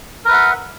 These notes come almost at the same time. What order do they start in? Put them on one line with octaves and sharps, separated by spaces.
A#4 B4 E5 F#5